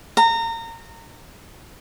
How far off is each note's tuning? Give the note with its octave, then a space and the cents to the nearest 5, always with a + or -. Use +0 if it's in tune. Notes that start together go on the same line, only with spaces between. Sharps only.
A#5 -25